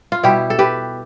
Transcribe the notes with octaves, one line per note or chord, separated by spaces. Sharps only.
F4
B2 G3 E4 G4
A4
G4 B4